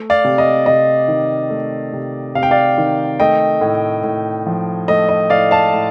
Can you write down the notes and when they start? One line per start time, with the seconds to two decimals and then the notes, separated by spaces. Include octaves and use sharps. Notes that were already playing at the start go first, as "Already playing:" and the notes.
Already playing: A3
0.10 D5 F5
0.25 C3
0.38 D#5
0.66 C3 D#5
1.08 D#3
1.50 A3
1.93 C3
2.35 C3 F5
2.43 G5
2.51 D5 F5
2.78 D#3
3.20 A3 D#5 G5
3.61 A2
4.04 A2
4.47 F3
4.88 A3 D#5
5.09 D#5
5.30 A2 D5 F5
5.51 F5 A5
5.73 A2